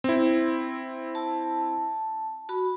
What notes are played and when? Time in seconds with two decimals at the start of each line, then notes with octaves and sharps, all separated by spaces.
0.04 C4 E4
1.15 A5
2.49 F#4 B5